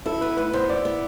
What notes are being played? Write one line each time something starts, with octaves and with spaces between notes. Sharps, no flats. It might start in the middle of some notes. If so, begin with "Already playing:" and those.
E4 A4
B3 B4
A2 B4
B3 C5
E4 D5
B3